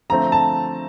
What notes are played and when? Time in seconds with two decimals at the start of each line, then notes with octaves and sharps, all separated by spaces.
0.09 D3 F3 A3 C4 A#5
0.32 A5